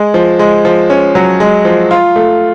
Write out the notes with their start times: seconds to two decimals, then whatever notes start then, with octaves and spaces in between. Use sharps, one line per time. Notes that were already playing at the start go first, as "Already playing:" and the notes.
Already playing: G#3
0.14 F3
0.39 G#3
0.65 F3
0.90 C#4
1.15 F#3
1.40 G#3
1.65 F3
1.91 F4
2.16 A3